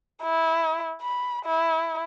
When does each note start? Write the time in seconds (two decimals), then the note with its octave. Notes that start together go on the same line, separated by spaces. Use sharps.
0.23 E4
1.02 B5
1.46 E4